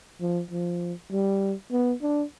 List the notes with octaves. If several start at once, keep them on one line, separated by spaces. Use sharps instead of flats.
F3
F3
G3
B3
D4